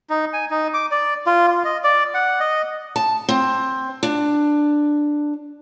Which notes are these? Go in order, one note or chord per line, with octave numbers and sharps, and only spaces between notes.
D#4
G#5
D#4
D6
D5
F4
F4
D#5
D5
F#5
D#5
A5
C4
D4